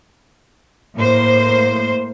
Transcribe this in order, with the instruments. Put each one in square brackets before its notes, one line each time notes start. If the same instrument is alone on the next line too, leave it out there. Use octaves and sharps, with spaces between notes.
[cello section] A2 A#3 C5